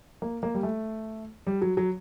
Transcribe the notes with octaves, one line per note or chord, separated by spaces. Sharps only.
A#3
A#3
G3
A3
G3
F#3
F#3